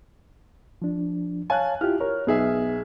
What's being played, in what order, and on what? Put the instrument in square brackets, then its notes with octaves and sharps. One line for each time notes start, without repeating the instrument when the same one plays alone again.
[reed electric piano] F3 D4
[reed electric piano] C#5 F5 A5 [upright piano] G#5 F#6
[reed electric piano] E4 F4 G4 [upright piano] F6
[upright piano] A#4 [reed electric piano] C#5
[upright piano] B1 G#4 E5 [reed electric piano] B3